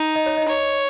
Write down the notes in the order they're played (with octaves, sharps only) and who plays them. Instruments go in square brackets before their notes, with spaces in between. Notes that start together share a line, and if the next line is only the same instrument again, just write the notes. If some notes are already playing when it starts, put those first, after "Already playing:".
Already playing: [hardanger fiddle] D#4
[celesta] D#5
C#5
D#5
[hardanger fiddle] C#5